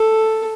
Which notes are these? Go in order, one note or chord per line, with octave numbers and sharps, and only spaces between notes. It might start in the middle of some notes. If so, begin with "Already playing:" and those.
Already playing: A4